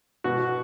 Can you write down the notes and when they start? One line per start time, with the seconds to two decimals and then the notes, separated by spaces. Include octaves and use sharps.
0.24 B2 F#4